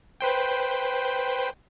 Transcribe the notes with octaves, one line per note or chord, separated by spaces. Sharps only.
B4 C5 G5